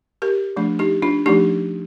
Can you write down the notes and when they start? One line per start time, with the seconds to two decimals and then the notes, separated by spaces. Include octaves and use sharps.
0.22 G4 A#4
0.57 F3 A3 D4
0.79 D#4 G4
1.02 D4 F4
1.26 F3 A3 D4 D#4 G4